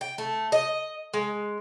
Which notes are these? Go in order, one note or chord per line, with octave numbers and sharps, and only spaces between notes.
G5
A3
D#5
G#3